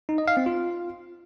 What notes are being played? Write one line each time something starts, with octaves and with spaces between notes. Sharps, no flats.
D#4
D#5
F5
C4
F4